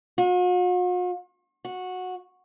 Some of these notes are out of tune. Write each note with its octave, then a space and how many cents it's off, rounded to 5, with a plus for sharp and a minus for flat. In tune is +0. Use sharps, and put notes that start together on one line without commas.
F#4 -45
F#4 -15